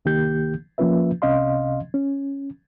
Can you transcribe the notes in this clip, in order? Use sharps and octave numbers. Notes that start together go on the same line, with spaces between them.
C2 D#3 A#3 G4 G6
F3 A#3 C#4 F4 B4 E5
C2 C3 C#4 D#5 F5 C6
C#4